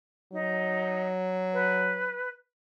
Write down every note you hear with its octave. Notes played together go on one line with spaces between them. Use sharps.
F#3 D#4
B4